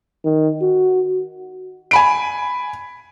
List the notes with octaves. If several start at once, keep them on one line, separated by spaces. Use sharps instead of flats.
D#3
F#4
G#5 B5 D7